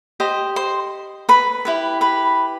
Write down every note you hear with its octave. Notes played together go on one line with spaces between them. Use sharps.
G4 C5 D#5
C5 C6
B4 B5
E4 G4 B4
B4 B5